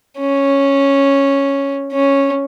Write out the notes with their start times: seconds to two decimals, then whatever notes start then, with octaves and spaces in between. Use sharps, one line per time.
0.18 C#4
1.92 C#4